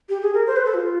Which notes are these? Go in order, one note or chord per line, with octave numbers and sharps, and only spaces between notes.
G4
G#4
A#4
C5
B4
A4
F4